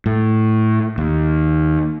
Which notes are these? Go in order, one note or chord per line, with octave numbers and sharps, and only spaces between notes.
A2
D#2